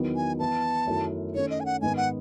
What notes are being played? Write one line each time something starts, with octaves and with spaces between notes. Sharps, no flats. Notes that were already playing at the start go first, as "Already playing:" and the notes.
Already playing: E2 D#3 F#3 B3 D#4
G#5
E3 B3 E4 A5
F#2 D#3 A3 E4
D#3 A3 C#4 C#5
D#5
G#5
F#5
G#2 D#3 G#3 B3 G#5
F#5